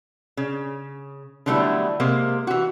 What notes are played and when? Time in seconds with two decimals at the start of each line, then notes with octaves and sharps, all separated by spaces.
0.37 C#3
1.46 D3 F#3 G3 A3 B3 E4
2.00 C3 G#3 A#3
2.47 E3 F#4